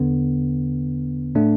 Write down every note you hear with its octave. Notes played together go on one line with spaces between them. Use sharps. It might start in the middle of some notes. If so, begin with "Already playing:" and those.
Already playing: E2 D3 B3
A2 A3 D4